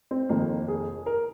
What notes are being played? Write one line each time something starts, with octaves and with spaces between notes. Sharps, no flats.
C4
F1 F2 D#3 A#3
G#4
A#4